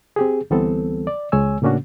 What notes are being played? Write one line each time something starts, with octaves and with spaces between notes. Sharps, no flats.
C4 G4 G#4
D2 E3 G3 B3 C4 A4
D5
C#2 G#3 C#5 G#5 E6
A2 C#3 A#3 C#4 D4 F#4